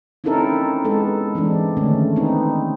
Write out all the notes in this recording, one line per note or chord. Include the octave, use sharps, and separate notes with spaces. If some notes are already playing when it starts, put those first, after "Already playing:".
C4 C#4 D#4 E4 A4 A#4
G#3 B3 A4
E3 G#3 C4 D4
D3 D#3 A3 C#4
B3 C4 D#4